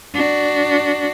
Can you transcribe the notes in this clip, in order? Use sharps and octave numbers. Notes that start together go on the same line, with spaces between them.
D4 F#4